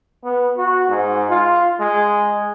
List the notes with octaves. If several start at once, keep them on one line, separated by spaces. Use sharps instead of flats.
B3
F#4
G#2
F4
G#3